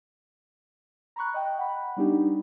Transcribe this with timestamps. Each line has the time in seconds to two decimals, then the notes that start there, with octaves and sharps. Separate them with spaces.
1.16 A#5 B5 C#6 F#6
1.34 D#5 G5
1.58 F#5 B5
1.80 B5
1.97 G3 B3 D4 D#4 G4